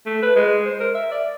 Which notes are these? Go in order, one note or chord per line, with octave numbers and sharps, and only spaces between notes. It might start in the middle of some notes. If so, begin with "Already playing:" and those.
A3
B4
G#3
C5
A#4
E5
D5